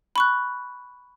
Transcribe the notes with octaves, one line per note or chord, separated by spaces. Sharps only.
B5 C#6 F#6